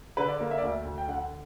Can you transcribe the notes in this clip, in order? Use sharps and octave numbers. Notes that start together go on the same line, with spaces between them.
D3 B4
D5
A#3
E5
D5
D2 E5
D2
G5
D3 F#5